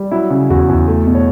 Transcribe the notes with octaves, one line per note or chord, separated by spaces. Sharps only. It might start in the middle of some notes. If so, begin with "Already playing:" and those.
Already playing: G3
F#3 E4
C#3
E2 F#4
E2
A3
B2
C#5